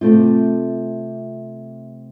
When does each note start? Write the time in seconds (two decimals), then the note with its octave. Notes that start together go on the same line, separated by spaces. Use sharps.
0.01 C3 A3 C4 F4